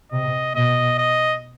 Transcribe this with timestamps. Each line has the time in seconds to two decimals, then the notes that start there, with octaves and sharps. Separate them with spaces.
0.12 C3 D#5
0.55 B2 D#5
0.98 D#5